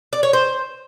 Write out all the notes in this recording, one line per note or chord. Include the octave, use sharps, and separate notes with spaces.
D5
C#5
C5